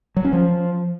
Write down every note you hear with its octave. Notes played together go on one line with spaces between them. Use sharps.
F#3
C#4
F3